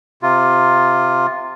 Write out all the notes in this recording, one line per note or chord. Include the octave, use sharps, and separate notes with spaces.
C3 F4